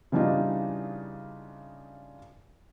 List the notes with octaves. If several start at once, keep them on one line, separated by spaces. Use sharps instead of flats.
C#3 E3 G3 D4 D#4 F4